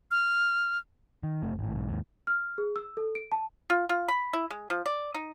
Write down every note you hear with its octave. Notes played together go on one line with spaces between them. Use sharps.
F6
D#3
F#1 C3 A3
G#1 A2
B1 G#2
D#2 G#2
F6
G#4
E6
A4
D7
A5
F4
F4
B5
E4
G#3
F3
D5
D#4